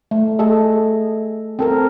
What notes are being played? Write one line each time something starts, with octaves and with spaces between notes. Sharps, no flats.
A3
A3 G#4 A4 D#5
C4 A4 A#4